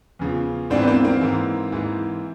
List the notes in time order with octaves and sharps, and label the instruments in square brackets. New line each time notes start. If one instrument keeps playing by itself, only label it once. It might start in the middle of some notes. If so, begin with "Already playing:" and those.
[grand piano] E2 C#3 F3
G#2 E3 C4 D4
B3
A#3 C4
A#3 C4
G#2 E3
G#2 E3